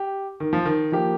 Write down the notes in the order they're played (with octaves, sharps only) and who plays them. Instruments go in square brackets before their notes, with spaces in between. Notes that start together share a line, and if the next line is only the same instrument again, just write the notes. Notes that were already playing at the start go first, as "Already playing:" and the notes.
Already playing: [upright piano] G4
[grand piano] D#3
F3
D#3
[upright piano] F3 A#3 G4